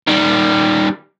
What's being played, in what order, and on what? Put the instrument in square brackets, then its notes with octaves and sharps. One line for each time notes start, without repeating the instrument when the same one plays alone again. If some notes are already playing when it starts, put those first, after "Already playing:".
[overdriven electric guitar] D#3 G3